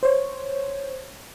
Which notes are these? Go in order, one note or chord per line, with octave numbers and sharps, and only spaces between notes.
C5 C#5